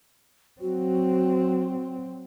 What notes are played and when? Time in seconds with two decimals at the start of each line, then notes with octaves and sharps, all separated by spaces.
0.61 F#3 C4 F#4